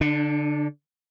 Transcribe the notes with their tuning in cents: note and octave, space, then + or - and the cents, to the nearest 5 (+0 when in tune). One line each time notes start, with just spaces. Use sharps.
D3 -15 D4 +30